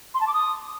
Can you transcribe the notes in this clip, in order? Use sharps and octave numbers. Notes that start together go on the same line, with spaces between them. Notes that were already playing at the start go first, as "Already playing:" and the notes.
C6
A5
D6
D#6